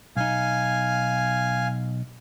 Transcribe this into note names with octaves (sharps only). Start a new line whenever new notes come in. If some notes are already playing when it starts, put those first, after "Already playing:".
B1 D#4 F5 G#5